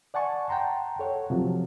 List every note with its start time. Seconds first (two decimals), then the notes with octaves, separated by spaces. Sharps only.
0.14 D5 F#5 G#5 A5 C#6
0.49 F#5 G5 A5 A#5 C6
0.99 A4 C#5 F#5
1.30 C3 F3 F#3